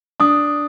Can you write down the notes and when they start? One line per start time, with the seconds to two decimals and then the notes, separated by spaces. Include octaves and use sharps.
0.20 D4 D#6